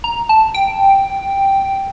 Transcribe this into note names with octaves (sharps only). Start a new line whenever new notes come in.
A#5
A5
G5